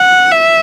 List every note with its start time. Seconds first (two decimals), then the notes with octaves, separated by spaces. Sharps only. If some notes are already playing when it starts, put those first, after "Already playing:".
Already playing: F#5
0.32 E5